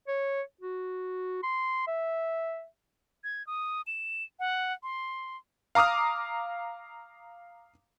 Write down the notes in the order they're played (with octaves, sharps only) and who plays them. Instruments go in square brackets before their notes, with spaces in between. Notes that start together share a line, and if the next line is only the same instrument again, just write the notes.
[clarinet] C#5
F#4
C6
E5
[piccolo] G#6
D#6
E7
F#5
C6
[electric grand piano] F5 A#5 D6 D#6 F6